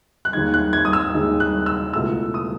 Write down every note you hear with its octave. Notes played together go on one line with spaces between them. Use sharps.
F#6
D#2 D#3 G#3 D#4 G#6
F#6
G#6
D#6
E6
D#2 D#3 G#3 D#4
F#6
E6
C#2 B2 A3 E4 E6
D#6